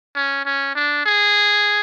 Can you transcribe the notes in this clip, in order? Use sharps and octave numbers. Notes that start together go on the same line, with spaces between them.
C#4
C#4
D4
G#4